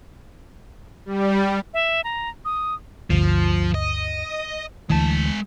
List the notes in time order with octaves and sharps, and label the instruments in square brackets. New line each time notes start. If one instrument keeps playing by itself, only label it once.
[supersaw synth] G3
[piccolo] E5
A#5
D#6
[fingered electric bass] G1 D2 [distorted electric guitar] F3
[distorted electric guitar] D#5
[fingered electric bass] D2 E3 [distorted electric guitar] G#3 A5